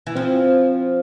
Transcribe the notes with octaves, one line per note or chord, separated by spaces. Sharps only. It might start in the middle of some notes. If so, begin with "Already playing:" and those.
E3
F3 C4